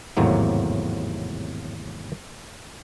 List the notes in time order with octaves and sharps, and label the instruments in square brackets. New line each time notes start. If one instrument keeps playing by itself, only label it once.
[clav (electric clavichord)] G#1 E2 A2 C3 F#3 A#3